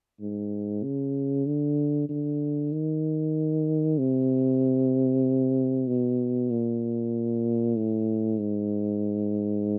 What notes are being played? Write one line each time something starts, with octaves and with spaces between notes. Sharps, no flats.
G#2
C#3
D3
D3
D#3
C3
B2
A#2
A2
G#2